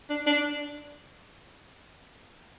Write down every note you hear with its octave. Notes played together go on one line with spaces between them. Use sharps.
D4
D4